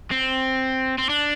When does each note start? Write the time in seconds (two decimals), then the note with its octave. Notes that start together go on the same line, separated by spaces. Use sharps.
0.11 C4
0.98 C4
1.10 D4